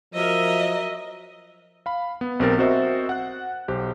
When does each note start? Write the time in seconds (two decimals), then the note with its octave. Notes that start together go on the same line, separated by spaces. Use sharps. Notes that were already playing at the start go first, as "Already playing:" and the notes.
0.14 F3 F#3 A#4 D#5 E5
1.86 F5 B5
2.21 B3
2.40 B1 C4 G4 A#4 A6
2.58 C4 F#4 A#4 C5 D#5 E5
3.09 F#5 F#6
3.68 B1 G4 C5